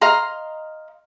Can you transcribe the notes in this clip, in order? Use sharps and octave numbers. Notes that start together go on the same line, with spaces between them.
D#5 F5 A#5 C6